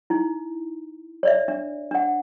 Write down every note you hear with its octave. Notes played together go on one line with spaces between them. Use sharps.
D#4 E4
C#5 D5 E5
D4 E5
D4 F#5